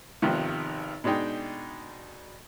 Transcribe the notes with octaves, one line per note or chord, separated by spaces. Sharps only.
G#1 C3 D#3 F3 B3
B2 G#3 D4 D#4 G5